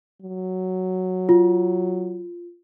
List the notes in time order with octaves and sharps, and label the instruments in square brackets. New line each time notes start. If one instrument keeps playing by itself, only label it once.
[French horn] F#3
[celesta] F4